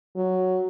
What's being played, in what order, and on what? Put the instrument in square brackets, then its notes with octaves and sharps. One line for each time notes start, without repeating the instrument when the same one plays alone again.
[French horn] F#3